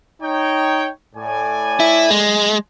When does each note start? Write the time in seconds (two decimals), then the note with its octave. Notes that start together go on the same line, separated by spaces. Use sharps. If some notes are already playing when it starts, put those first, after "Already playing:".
0.22 D#4 C#5 G5
1.16 A2 D5 G#5
1.80 E4
2.10 G#3